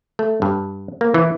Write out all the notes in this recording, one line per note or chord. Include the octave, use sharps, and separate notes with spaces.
A3
G2
A#3
E3